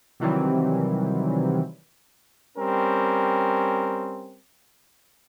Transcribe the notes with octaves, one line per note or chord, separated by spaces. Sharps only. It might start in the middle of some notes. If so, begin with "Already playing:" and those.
C3 D#3 E3 F#3 G3 C4
G3 C4 C#4 A#4